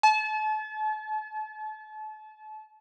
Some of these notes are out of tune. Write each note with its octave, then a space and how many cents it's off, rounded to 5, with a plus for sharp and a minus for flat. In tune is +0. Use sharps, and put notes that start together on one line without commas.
A5 -35